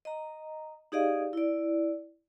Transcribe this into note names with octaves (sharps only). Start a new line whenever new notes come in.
D#5 A#5
D#4 G4 G#4 D5 D#5 F5
E4 D5